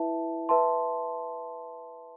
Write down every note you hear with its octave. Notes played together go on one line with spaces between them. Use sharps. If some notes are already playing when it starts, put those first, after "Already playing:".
Already playing: E4 B4 E5 A5
B4 E5 A5 C6